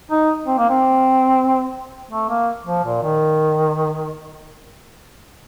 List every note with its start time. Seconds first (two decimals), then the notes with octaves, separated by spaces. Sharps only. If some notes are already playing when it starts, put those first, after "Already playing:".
0.11 D#4
0.47 C4
0.58 A#3
0.69 C4
2.11 A3
2.29 A#3
2.66 F3
2.84 A#2
3.02 D#3